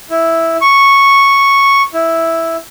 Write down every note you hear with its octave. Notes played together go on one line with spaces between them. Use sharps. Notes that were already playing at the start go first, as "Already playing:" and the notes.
E4
C#6
E4